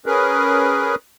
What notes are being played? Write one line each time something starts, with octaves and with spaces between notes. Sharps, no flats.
C#4 G#4 A#4 B4